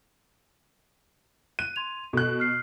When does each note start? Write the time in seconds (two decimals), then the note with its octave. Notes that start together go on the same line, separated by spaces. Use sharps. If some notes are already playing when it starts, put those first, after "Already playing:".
1.59 F#6 D#7
1.76 C6 G#6 F7
2.13 B2 A4 F#6
2.40 F6 C7